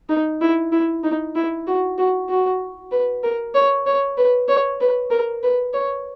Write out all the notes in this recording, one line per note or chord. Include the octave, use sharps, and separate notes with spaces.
D#4
E4
E4
D#4
E4
F#4
F#4
F#4
B4
A#4
C#5
C#5
B4
C#5
B4
A#4
B4
C#5